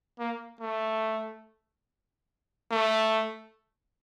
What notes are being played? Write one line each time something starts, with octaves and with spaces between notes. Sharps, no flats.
A#3
A3
A3